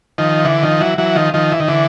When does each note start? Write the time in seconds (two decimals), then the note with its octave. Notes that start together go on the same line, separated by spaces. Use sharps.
0.18 D#3 F3
0.45 D3 E3
0.62 D#3 F3
0.80 E3 F#3
0.98 E3 F#3
1.15 D#3 F3
1.34 D#3 F3
1.52 E3
1.60 D#3
1.68 D3 E3